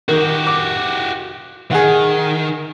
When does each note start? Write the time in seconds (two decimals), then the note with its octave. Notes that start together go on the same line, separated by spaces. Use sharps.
0.09 D#3 F#4 G4
0.47 D6
1.71 D#3 G#4 F#5